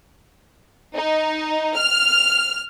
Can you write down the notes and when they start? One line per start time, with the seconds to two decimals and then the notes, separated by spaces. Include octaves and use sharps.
0.94 D#4
1.75 F6